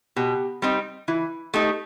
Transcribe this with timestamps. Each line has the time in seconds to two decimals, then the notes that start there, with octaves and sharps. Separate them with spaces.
0.16 B2 G4
0.62 G3 C4 D#4
1.08 E3 E4
1.54 A3 D#4 G4